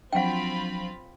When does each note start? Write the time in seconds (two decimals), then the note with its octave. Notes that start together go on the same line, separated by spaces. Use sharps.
0.13 F3 F#3 C4 D4 F4 F#5 G5 B5